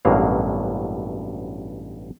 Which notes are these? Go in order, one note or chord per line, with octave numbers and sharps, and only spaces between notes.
A1 G2 B2 F#3 A#3 F5